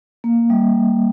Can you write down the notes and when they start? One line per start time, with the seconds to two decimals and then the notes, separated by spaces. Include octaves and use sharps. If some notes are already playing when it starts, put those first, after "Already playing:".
0.24 A#3
0.50 G3